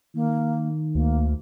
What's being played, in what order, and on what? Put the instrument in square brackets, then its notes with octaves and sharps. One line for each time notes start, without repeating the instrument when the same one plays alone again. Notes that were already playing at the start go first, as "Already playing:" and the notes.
[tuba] D#3 [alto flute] A#3
[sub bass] D2 [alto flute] A#3